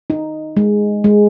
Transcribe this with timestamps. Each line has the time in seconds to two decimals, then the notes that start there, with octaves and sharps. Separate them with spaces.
0.10 D#4
0.57 G#3
1.04 G#3